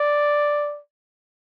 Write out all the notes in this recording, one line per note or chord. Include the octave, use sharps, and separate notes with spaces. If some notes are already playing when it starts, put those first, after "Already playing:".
Already playing: D5